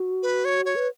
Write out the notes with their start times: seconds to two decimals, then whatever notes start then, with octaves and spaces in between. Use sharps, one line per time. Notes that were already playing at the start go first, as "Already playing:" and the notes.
Already playing: F#4
0.23 B4
0.45 C#5
0.65 C#5
0.76 B4